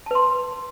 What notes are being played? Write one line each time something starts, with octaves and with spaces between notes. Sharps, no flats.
B4 A5 C6